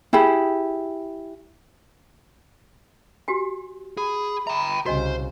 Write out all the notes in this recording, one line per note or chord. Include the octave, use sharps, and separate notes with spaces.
E4 G4 G#4 B5
F#4 G4 G#5
G#4 B5
E5 G5 A#5
C2 C#3 F#4 C5 D#5 G#5